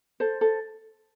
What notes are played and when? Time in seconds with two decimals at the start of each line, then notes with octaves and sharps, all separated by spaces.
0.20 A4 C5
0.41 A4